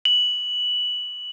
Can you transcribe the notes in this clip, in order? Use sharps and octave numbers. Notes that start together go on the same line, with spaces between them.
F#7